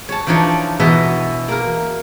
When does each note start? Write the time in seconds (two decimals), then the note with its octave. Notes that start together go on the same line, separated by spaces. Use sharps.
0.09 C#5 A5
0.27 E3 F3 D4 D#4 C#5
0.80 B2 E3 B3 D#5 E5
1.48 A#3 A#4